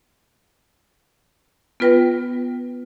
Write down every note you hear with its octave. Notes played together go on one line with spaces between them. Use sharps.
B3 F4 B4 G5 A#6